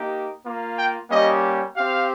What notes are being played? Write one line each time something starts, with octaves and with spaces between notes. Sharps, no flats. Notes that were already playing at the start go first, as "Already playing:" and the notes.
Already playing: A#3 D#4 G4
A#3 F4
G5
G3 A#3 C#4 G4 D#5
C4 G4 F5